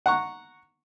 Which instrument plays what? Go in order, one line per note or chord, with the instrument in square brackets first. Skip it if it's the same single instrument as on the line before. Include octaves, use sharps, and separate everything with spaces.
[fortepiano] F#5 A#5 C#6